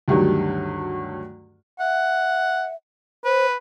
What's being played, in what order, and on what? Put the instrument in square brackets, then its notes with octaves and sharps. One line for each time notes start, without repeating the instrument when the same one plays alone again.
[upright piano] D2 G2 D#3 F#3
[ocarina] E5 [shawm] F#5
[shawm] B4 [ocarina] C5